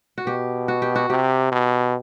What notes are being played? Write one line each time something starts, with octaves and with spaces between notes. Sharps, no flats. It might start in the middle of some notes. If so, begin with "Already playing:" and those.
F#4
B2 G4
F#4
G4
F#4
C3 G4
B2